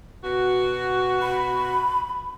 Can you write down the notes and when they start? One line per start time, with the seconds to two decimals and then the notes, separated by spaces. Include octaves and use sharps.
0.24 B2 F#4
1.22 B5